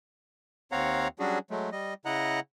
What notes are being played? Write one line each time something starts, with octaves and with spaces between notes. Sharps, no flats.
D#2 C4 C#5 F5 F#5 A#5
F#3 G3 C#4 D4 F#4 G#4
F#3 G#3 A3
G3 D#5
C#3 E4 D#5 F#5 A#5 F#6